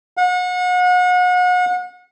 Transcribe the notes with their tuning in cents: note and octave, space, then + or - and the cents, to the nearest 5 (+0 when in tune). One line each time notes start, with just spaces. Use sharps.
F#5 -35